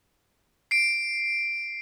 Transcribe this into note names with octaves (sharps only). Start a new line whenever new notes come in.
C7 D7